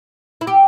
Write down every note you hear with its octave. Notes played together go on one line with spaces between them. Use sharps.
E4
G4